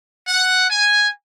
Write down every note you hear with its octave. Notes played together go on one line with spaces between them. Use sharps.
F#5
G#5